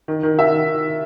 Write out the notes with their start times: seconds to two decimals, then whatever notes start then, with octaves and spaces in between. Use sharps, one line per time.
0.08 D#3
0.23 D#3
0.39 D#3 E5